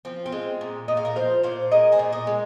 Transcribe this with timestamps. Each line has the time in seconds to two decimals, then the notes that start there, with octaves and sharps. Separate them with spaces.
0.05 F3 C4
0.26 C4 F4
0.32 G#3
0.61 A#2
0.88 A#2 D#5
0.97 F5
1.05 A#4 D#5
1.16 F3 C5 F5
1.43 A#2 C5 F5
1.71 G#3 A#4 D#5
1.92 G#4 C5
1.99 A#2
2.13 A#4 D#5
2.27 G#3